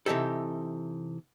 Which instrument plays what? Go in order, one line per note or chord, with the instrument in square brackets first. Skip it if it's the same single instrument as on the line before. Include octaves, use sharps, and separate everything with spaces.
[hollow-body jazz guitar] C3 E3 D#4 G4 A4